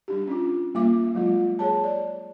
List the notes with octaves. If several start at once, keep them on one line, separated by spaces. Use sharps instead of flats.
G3 D4 G4
C#4 F4
G3 A#3 F4 E5 D6
F#3 G#3 F4
G#4 C#5 A5
D5